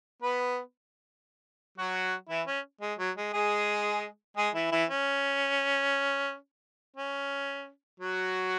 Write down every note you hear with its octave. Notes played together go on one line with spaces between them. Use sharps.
B3 B4
F#3 F#4
E3 E4
C#4
G#3
F#3
G#3
G#3 G#4
G#3 G#4
E3 E4
E3 E4
C#4
C#4
F#3 F#4